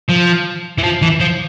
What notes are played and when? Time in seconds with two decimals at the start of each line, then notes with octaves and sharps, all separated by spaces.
0.09 F3
0.78 E3
0.83 F3
1.02 E3
1.20 F3